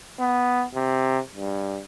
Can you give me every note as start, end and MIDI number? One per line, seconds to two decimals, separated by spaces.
0.20 0.65 59
0.75 1.19 48
1.36 1.80 43